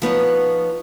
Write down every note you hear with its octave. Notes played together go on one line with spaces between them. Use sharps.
F3 B3 D#4 C#5